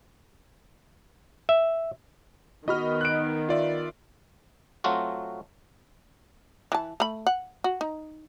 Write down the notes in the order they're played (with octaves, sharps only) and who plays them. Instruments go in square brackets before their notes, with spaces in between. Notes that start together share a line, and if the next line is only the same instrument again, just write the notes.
[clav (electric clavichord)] E5
[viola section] D#3 B3 [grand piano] F#4 [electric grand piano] D#5 B5 F6
[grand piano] F#6 D7
[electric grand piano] F4 D5 E5
[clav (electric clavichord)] F#3 A3 C4 F4 F#4
[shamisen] E3 A5
A3 B5
F#5
F#4
D#4